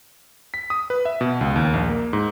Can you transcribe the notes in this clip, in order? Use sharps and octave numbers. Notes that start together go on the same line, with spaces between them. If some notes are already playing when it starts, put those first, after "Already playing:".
B6
D#6
B4
E5
B2
C#2
D#2
A#1
A#3
G#2